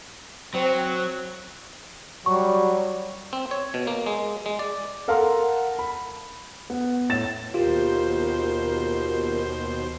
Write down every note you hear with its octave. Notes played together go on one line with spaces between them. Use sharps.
F#3 C4
F#3 G3 C#6
C4
C#5
B2
A#3
G#3
G#3
D5
A4 A#4 F5 F#5 C6
B5
B3
A2 A6 E7
D#2 B2 F4 G4 A#4 C5